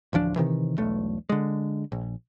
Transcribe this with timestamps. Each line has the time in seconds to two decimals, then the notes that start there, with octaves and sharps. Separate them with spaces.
0.13 A1 D2 F3 D4
0.36 C3 D#3 E3
0.78 E1 B1 A3
1.29 D3 G#3
1.92 A#1